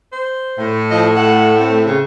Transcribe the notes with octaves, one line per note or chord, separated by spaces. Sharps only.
C5
A2
F3 D#5
A3 F#5
C4
C#3